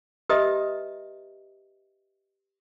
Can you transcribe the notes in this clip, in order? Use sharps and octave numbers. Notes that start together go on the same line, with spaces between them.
G4 B4 D#5 E5 A#5 D#6